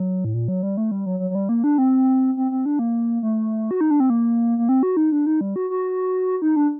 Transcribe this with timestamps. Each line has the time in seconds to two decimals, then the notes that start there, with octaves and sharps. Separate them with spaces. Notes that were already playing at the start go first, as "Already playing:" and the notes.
Already playing: F#3
0.25 A2
0.34 A#2
0.48 F#3
0.63 G3
0.77 A3
0.91 G3
1.06 F#3
1.20 F#3
1.30 F#3
1.35 G3
1.49 A#3
1.64 D4
1.78 C4
2.37 C4
2.51 C4
2.66 D4
2.79 A#3
3.23 A3
3.71 F#4
3.81 D#4
3.91 D4
4.00 C4
4.10 A#3
4.58 A#3
4.69 C4
4.83 F#4
4.97 D#4
5.12 D4
5.26 D#4
5.41 G3
5.56 F#4
5.70 F#4
6.42 D#4
6.56 D4